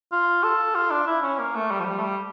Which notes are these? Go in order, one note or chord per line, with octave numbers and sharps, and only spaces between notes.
F4
A4
F4
D4
E4
C#4
A#3
A3
G3
F3
G3
A3
G3